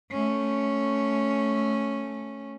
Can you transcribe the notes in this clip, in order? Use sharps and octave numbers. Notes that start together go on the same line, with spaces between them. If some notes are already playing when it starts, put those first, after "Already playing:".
A3 C#4